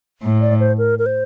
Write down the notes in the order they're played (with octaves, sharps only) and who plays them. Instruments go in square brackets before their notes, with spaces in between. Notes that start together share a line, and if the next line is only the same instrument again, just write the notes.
[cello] A2
[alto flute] D5
C5
A#4
A#4
C5